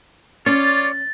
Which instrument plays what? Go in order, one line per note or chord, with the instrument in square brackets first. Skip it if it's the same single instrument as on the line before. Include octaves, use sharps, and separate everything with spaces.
[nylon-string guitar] C#4 [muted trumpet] F4 [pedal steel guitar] C#5 D5 [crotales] A6